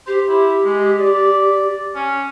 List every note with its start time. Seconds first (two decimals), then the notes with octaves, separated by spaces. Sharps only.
0.07 G4 C5
0.28 E4
0.64 G#3
1.00 D5
1.95 C#4